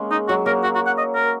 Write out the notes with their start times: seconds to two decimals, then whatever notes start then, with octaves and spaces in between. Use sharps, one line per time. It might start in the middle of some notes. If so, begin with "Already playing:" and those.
Already playing: G#3 A#3 C#4
0.11 D#4
0.28 F#3 F#4
0.46 F#3 A#3 A#4
0.63 F#4
0.75 F#4
0.86 F#5
0.98 D#5
1.15 A#4